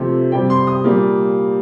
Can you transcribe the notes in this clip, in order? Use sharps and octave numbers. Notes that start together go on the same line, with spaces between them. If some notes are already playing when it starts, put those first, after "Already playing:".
Already playing: C3 F3 A3 C4
C3 G3 C4 G5
C6
D#6
A#2 G3 A#3